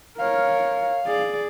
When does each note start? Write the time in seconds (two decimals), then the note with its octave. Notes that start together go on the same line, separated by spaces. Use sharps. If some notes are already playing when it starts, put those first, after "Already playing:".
0.18 A#4 C#5 F5
1.07 G#4 D5